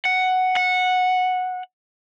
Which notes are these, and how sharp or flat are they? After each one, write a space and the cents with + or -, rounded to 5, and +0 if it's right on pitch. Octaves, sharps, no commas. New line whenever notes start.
F#5 +5
F#5 -10